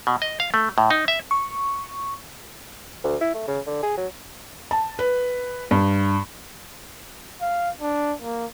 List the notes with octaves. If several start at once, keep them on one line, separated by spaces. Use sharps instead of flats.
B2
D#5
F5
A3
A2
D#4
E5
C#6
D2
E4
A3
C#3
D3
G#4
F#3
A5
B4
G2
F5
D4
A#3